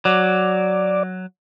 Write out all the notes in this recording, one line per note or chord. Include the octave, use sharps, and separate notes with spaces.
F#3 D5